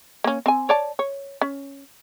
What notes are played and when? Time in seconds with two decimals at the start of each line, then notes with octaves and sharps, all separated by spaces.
0.24 A#3 C#4
0.46 C4 G#5
0.69 C#5 D5 A5
0.99 C#5
1.41 C#4